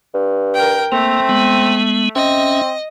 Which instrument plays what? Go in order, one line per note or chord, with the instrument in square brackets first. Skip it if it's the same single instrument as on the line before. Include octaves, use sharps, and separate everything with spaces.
[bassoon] G2
[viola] A#4 G5
[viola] A3 [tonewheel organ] A#3 [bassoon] C4
[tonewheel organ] G#3 B3
[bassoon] C4 [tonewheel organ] C#4 E5 [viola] D#5